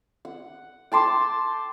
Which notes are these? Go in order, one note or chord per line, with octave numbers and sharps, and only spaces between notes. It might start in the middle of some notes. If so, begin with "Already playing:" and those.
F#5
G5 A5 C6 D6